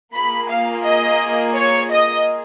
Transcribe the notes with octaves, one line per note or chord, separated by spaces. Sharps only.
A#3 F4 G#4 B5
F5
D#5
C#5
D#5